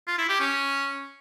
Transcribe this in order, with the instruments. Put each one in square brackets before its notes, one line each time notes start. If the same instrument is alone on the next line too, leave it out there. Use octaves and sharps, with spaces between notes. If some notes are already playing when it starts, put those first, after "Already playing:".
[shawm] F4
E4
G4
C#4